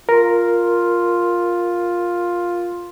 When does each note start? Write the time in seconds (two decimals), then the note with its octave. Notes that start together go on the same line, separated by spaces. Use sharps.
0.09 F4 A#4